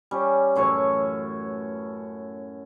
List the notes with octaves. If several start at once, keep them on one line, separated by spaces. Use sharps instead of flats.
G3 C#4
F#2 A2 E3 C#5